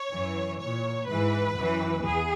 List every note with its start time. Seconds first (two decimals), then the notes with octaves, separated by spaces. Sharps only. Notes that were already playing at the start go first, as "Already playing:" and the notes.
Already playing: C#5
0.11 F#2 E3
0.59 A#2 C#5
1.08 G#2 E3 B4
1.57 F#2 E3
2.05 E2 G#4